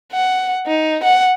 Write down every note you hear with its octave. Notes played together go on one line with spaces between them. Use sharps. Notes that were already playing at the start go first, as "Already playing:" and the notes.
F#5
D#4
F#5